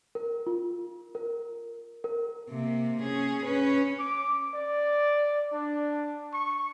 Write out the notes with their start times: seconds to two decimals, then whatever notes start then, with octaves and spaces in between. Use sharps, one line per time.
0.15 A#4
0.47 F4
1.15 A#4
2.04 A#4
2.50 C3 A#3
3.03 C#4 G#4
3.45 C#4 B4
4.00 D6
4.55 D5
5.53 D4
6.33 C#6